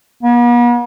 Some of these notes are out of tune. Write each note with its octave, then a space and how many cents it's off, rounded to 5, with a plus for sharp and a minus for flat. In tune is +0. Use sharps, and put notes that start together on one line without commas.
B3 -45